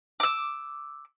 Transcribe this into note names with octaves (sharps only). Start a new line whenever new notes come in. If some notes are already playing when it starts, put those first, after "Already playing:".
D6 E6